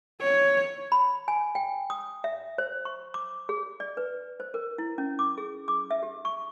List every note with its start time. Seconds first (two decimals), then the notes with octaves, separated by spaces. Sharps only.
0.21 C#5
0.92 B5
1.28 G#5
1.55 G5
1.90 D#6
2.24 E5
2.58 C5
2.85 C#6
3.14 D6
3.49 G#4
3.80 D5
3.97 B4
4.40 C5
4.54 A#4
4.78 E4
4.98 C#4
5.19 D6
5.38 G#4
5.68 D6
5.91 E5
6.03 G4
6.25 C#6